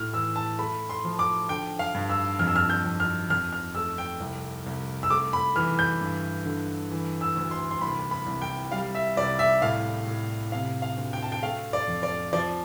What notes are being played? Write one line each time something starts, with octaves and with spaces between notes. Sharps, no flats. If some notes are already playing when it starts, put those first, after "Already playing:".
Already playing: A2 F6
E3 E6
A5
A3 B5
C6
F3
D6
D3 G5
F5
G2
E6
F2 F6
E6
F6
G6
F2
F6
F2 F6
F6
A3 E6
G5
C2
C2
E6
A3 D6
B5
E3 F6
G6
G2
D3
E3
E6
D2
C6
C6
C2 B5
B5
C2
G5
G3 F5
E5
C2 D5
E5
A2 F5
A2
C3 F5
F5
D2
G5
A5
G5
A3 F5
D5
F2
D5
F3 D5